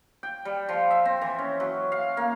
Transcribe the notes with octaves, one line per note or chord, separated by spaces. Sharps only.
G5
G3
F3
E5
C4
E3
C#4
F#3
F5
A#3